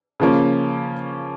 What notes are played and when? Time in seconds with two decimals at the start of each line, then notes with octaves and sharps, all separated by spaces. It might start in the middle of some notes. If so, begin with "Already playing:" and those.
0.20 C#3 F3 A#3 C#4